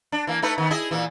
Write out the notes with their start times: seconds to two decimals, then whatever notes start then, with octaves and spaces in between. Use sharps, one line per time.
0.12 D4
0.27 E3 A#3
0.42 A3 D#4 B4
0.58 D#3 B3
0.71 E4 G#4 D#5
0.91 A#2 E3